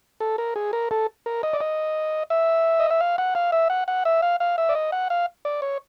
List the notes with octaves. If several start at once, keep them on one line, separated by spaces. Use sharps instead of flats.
A4
A#4
G#4
A#4
A4
A#4
D#5
D5
D#5
E5
D#5
E5
F5
F#5
F5
E5
F#5
F#5
E5
F5
F5
E5
D5
D#5
F#5
F5
D5
C#5